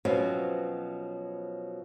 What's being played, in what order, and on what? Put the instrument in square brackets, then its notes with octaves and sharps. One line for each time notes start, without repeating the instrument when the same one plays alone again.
[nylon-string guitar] B2 F3 F#3 C4 C#4